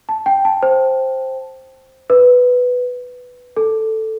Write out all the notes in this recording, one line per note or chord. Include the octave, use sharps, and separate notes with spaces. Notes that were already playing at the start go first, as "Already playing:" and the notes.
A5
G5
A5
C5
B4
A4